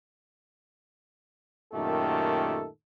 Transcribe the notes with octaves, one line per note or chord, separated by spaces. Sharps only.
F#2 A#2 D#3 A3 G4 A4